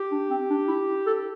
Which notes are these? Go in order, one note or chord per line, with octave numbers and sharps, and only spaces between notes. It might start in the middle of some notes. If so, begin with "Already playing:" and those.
Already playing: G4
D4
C4
D4
E4
A4